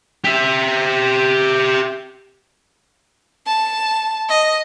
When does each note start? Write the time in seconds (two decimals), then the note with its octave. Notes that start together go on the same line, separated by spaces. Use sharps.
0.24 G4 E5
3.47 A5
4.29 D#5